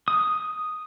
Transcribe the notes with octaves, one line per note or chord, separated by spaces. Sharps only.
D#6